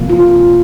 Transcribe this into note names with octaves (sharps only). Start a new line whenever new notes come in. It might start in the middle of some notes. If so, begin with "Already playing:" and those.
Already playing: C3 F3 A#3
F4